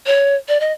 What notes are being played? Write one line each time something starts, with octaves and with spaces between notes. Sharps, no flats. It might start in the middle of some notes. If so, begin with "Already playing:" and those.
C#5
D5
D#5